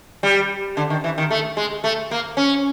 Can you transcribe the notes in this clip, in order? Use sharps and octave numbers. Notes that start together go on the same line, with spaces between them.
G3
D3
D#3
E3
D#3
A3
G#3
A3
A#3
C#4